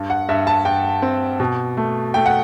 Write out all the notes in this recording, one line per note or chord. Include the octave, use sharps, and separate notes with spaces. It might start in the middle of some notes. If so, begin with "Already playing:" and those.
Already playing: G2
F#5
G2 E5
A5
G2 G5
C4
B2
A3
A3 G5
F#5